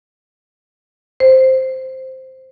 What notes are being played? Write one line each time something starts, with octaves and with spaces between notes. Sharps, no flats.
C5